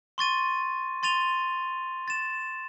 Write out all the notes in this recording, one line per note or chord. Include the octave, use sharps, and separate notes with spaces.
C6 C#6 A6 D#7
C6 A6 D#7 F7 G7
A6 E7